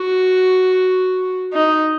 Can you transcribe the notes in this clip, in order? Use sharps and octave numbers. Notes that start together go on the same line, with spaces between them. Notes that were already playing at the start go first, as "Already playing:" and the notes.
Already playing: F#4
D#4